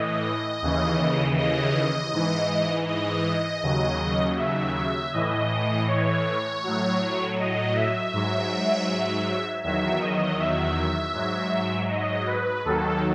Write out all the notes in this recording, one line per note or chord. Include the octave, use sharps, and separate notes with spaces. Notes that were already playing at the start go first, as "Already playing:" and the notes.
Already playing: A2 E3 D#5
D#2 C#3 E3
D#5
G#2 E3
D#5
D#2 C#3 F#3
E5
E5
A2 E3 D#5
C#5
A2 F#3
D#5
E5
G#2 F#3
E2 D#3 F#3 E5
D#5
E5
G#2 F#3
D#5
B4
D#2 D#3 F#3 A4